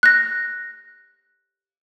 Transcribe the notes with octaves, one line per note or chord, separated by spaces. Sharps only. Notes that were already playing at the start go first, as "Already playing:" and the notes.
F#6 A#6